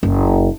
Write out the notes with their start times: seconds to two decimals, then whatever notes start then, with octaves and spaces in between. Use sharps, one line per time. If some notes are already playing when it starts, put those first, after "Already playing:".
0.03 F#1